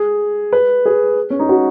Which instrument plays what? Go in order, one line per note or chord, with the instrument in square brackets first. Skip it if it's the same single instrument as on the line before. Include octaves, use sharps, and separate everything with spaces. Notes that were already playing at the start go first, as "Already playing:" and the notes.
Already playing: [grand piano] G#4
B4
G#4
C#4
D#4
F#4